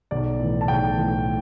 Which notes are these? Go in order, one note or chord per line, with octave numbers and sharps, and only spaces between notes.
B1 D5
A2 E3
A5
B1 G5
A2 E3